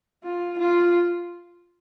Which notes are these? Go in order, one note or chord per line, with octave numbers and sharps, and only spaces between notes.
F4
F4